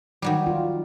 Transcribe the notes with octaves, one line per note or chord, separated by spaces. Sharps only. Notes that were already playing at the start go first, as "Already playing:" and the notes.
D#3 F#3 G3
F4